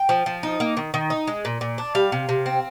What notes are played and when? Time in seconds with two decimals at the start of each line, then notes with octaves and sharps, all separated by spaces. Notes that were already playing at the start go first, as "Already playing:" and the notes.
Already playing: G5
0.09 F3
0.26 F3
0.43 D#4
0.60 A#3
0.77 D#3
0.94 D#3
1.10 D#4
1.27 G#3
1.45 A#2
1.61 A#2
1.78 D4
1.95 G3 F5
2.12 C3
2.29 C3
2.46 C4